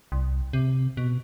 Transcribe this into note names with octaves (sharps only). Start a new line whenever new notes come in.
C2
C3
B2